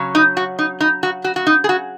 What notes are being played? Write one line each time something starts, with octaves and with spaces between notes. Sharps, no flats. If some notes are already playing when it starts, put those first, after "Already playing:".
Already playing: C#3 F#3 C#4
D#4
F#4
D#4
D#4
F#4
F#4
F#4
D#4
G#4
F#4